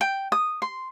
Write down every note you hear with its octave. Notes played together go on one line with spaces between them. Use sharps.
G5
D#6
C6